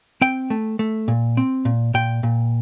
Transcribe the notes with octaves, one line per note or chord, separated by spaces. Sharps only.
C4 G5
A3
A3
A#2
C4
A#2
A#2 G5
A#2